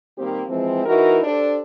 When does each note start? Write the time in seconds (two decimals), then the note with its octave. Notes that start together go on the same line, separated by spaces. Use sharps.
0.18 D#3 G3 A#3 C4 G4
0.48 E3 F3 G#3 C4
0.86 E3 D#4 E4 F#4 A#4
1.24 D4 G4 A4 C5 D5